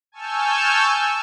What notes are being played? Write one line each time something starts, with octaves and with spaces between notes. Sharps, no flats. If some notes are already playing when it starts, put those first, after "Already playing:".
G#5 A5 C#6 E6 F6 G6